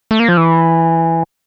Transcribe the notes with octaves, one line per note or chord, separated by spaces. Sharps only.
A3
A#3
F3
E3